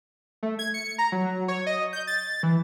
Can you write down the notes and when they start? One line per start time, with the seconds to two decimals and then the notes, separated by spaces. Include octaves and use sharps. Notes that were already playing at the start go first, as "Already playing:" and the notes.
0.43 A3
0.59 G#6
0.74 C#7
0.98 A#5
1.12 F#3
1.48 C#5
1.67 D#5
1.93 G6
2.07 A6
2.43 E3